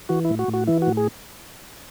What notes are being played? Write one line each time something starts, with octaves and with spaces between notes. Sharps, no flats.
E3 F#4
A2 E4
F#4
A2
F#4
E3 E4
A2 F#4
G#4